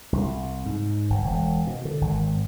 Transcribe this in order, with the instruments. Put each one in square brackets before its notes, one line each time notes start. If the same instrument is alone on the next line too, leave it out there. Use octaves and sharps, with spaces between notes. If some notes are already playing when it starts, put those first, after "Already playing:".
[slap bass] C2
G#2
G1
E1
B2
D3
G#1